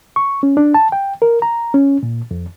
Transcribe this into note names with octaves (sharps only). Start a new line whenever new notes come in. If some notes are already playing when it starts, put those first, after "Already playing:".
C#6
C#4
D4
A5
G5
A#4
A#5
C#4
A#2
F2